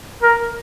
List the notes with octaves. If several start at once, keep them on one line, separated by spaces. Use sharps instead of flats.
A#4